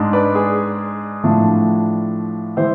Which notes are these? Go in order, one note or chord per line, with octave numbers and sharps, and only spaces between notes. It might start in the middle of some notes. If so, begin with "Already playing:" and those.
Already playing: G#2 G#3 D4
B4 D5
G#4
A2 F3 A3 D4
E3 G#3 C5 E5